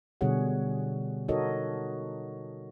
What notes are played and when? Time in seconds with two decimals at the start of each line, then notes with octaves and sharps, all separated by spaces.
0.21 B2 D3 G3 G#4 C#5 F#5
1.28 D#4 F#4 A4 A#4 C#5 D#5